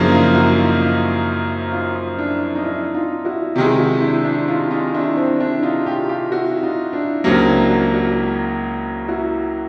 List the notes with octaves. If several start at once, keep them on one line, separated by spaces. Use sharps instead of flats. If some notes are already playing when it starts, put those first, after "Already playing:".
Already playing: F#2 C#3 F3 A#3 D4 E4
D#4 F4
E4 F#4
D#4 F4
D#4 F4
D#4 F4
D4 E4
D#4
D4 E4
D#4 F4
E4 F#4
C3 D#3 G#3 E4 F#4
E4 F#4
D4 E4
D4 E4
D#4 F4
D#4 F4
D4 E4
C4 D4
D4 E4
D#4 F4
F4 G4
F4 G4
E4 F#4
D#4 F4
D4 E4
C#2 C#3 F#3 A#3 C4 D4
D4 E4
E4 F#4
E4 F#4
E4 F#4